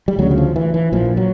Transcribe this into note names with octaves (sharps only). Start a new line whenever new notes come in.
G3
D2 C#3 F#3
F#3
F3
E3
E3
A#1 A#2 F3
F#3